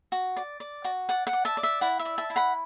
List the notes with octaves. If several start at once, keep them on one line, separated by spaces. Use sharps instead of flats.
F#4
D5
D5
F#4
D5 F#5
F#5
D5
E5 A5
D5
E5
E4 F#5
E5
D5
E5 A5
E4
F#5 B5